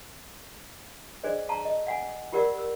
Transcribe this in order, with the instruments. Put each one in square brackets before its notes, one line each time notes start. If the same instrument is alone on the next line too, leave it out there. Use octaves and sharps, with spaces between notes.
[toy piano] D4 G#4 B4 C5 D5 D#5
F5 A5 A#5 C#6
D#5
F5 F#5 G#5
F4 G4 A#4 D5 F#5 E6
E6